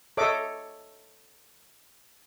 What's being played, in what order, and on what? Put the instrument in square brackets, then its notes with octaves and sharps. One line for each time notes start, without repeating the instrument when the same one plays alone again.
[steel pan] A4 C#5 D#5 E5 D6